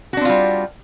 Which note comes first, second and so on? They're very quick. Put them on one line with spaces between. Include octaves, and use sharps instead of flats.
F#4 D4 C4 F4 G3